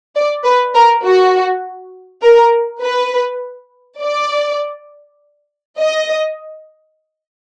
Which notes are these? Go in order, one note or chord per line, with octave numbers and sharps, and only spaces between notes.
D5
B4
A#4
F#4
A#4
B4
D5
D#5